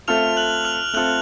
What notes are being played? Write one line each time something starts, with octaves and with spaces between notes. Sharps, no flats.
A3 C4 F4 A4 F6 F7
F#6 F#7
F6 F7
A3 C4 F4 A4 F#6 F#7